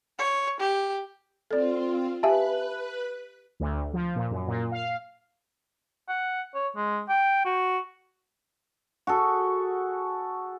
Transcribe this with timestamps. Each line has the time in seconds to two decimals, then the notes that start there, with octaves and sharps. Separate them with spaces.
0.19 C#5
0.60 G4
1.51 C4 F4 A4 D5
2.23 G4 B4 E5 F5 G#5 A5 F#6
3.60 D2
3.93 F3
4.16 A#2
4.31 F#2
4.48 A#2
4.71 F5
6.09 F#5
6.54 C#5
6.76 G#3
7.08 G5
7.45 F#4
9.07 F#4 G#4 A4